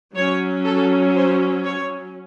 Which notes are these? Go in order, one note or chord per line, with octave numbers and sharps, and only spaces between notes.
F#3 C#4 C#5
A4
C5
C#5